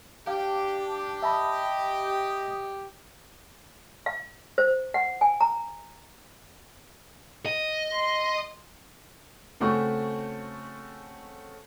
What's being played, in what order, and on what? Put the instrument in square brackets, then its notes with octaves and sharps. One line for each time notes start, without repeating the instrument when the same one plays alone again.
[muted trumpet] D4 [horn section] G4 [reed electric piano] F5
[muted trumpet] D#5 [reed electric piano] E5 A5 B5
[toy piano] F5
C5
F#5
G#5
A#5
[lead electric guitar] D#5
[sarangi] C6
[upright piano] C#3 A3 C4 F#4 A4 C#6